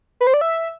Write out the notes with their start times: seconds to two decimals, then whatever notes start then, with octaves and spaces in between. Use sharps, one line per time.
0.21 B4
0.27 C5
0.34 D5
0.41 E5